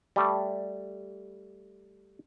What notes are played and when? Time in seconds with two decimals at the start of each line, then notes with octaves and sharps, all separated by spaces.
0.16 G3 A3